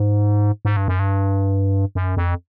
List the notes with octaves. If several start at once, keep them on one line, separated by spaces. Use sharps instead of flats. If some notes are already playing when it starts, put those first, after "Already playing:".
Already playing: G#2
G#2
G2
F#2
G2
F#2
F2